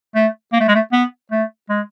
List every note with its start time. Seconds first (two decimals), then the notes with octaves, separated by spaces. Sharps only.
0.15 A3
0.53 A#3
0.60 A3
0.68 G#3
0.75 A3
0.92 B3
1.31 A3
1.69 G#3